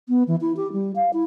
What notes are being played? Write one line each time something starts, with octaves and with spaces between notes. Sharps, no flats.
B3
E3
E4
G4
G3
F5
E4